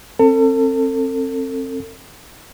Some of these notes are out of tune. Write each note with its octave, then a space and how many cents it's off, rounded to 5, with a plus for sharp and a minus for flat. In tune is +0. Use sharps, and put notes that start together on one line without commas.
C4 +30 A4 +35